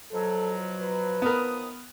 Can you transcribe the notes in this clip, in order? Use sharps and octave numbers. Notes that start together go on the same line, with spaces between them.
B2 F3 F#3 A4
B4
D#3 F3 B3 A#4 D#6